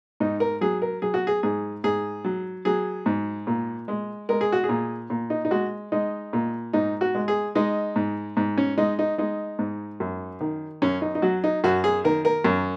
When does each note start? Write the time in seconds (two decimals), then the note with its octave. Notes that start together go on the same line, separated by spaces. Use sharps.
0.20 G#2 D#4
0.40 A#4
0.61 F#3 G#4
0.82 A#4
1.02 F#3 G#4
1.14 F#4
1.27 G#4
1.43 G#2 G#4
1.84 G#2 G#4
2.24 F#3
2.65 F#3 G#4
3.06 G#2
3.47 A#2
3.88 G#3
4.29 G#3 A#4
4.41 G#4
4.52 F#4
4.64 G#4
4.69 A#2
5.10 A#2
5.30 D#4
5.45 D#4
5.51 G#3 F#4
5.92 G#3 D#4
6.33 A#2
6.73 G#2 D#4
7.01 F#4
7.15 G#3
7.28 G#4
7.55 G#3 D#4
7.96 G#2
8.37 G#2
8.58 C#4
8.78 G#3 D#4
8.99 D#4
9.18 G#3 D#4
9.59 G#2
10.00 F#2
10.41 D#3
10.82 F#2 C#4
11.02 D#4
11.15 D#4
11.22 F#3 F#4
11.44 D#4
11.64 F#2 F#4
11.84 G#4
12.04 D#3 A#4
12.25 A#4
12.44 F#2